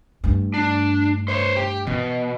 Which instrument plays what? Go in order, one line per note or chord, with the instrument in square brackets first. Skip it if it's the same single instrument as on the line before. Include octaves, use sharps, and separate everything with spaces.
[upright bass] G2 A3
[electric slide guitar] D4
C5 C#5
G4
[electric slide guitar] B2 [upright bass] E3